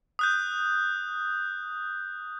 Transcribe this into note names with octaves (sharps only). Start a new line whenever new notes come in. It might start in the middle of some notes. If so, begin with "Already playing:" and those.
D#6 F#6 G6